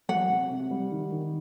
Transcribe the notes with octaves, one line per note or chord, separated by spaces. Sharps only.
F#3 F#5
C3
C3
G3
D#3
D#3